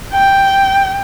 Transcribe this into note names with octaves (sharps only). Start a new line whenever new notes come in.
G5